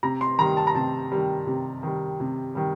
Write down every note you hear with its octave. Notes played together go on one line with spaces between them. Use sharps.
C3 A#5
C6
D#3 G3 A#5
A5
A#5
C3 A5
D#3 G3
C3
D#3 G3
C3
D#3 G3